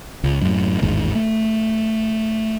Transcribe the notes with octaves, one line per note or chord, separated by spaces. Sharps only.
C#2
F#2 A2
A1 E2 G#2 D#3
A3